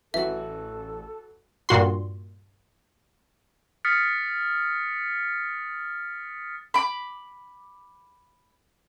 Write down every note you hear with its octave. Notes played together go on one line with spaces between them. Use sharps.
A1 E3 F#3 F#4 A4 E5
G2 A#2 F#4 C6
D#6 F6 A6 B6 C#7
B5 D6